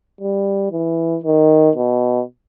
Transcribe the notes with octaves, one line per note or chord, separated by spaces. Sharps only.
G3
E3
D#3
B2